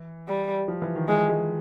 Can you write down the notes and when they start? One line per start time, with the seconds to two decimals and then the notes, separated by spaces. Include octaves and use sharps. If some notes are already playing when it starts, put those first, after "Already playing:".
Already playing: E3
0.28 G3
0.68 F3
0.82 E3
0.95 D#3
1.08 E3 G#3
1.29 G#3